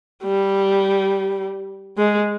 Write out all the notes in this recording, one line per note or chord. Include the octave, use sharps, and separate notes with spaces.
G3
G#3